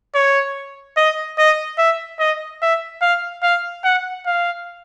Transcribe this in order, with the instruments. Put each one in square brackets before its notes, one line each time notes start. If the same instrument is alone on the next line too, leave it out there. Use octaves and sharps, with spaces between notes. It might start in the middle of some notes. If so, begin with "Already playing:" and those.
[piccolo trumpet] C#5
D#5
D#5
E5
D#5
E5
F5
F5
F#5
F5